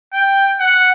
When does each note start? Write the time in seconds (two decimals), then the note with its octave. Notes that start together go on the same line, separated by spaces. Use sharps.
0.13 G5
0.60 F#5